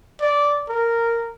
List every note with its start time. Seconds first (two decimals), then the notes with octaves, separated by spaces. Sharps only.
0.21 D5
0.69 A#4